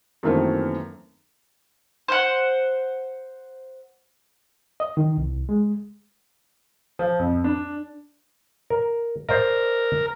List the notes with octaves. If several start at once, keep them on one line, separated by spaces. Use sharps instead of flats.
F#2 D#3 E3 A3 A#3 C4
C5 F#5
D#5
D#3
C2
G#3
F3
F2
D4
A#4
A#4 C5 D5 D#5